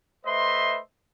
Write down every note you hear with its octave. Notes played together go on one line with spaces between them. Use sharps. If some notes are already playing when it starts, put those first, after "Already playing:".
A3 B4 C5 D#5 E5 C6